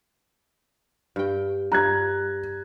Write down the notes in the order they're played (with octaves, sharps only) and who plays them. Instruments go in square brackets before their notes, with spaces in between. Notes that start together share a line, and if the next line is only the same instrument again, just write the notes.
[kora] G2 G5
[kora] G2 [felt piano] A#5 F#6 G#6